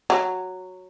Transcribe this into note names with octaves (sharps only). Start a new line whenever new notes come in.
F#3